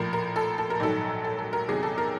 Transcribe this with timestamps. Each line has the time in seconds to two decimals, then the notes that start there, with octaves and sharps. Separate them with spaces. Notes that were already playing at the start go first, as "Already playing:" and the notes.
Already playing: A#1 A2 F3 A#4
0.13 A#4
0.36 A4
0.58 A4
0.70 A#4
0.80 A#1 G#2 D#3 F#3 A4
1.24 A4
1.39 A4
1.53 A#4
1.68 E2 C3 D#3 F#3 G#4
1.83 A4
1.98 A#4